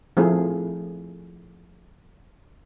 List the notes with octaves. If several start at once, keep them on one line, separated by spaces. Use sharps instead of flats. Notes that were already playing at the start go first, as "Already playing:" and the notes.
F3 A3 C4 E4 G#4